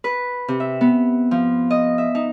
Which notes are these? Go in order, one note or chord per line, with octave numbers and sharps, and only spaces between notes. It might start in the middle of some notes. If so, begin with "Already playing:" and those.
B4
C3
E5
B3
F3
D#5
E5
D#4